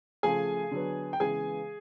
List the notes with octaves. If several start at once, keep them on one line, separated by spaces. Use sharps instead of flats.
C#3 F3 A3 G#4 G#5
D3 F#3 B3
G5
C#3 E3 G#3 B3 G#4 G#5